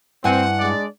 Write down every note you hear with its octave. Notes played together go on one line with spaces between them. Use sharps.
G2 C4 E4 F#5 G#5
G#3 D4 D5